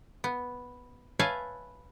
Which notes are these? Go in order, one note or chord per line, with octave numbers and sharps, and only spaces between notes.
B3
B4 C#5 E5 F5 G#5 A5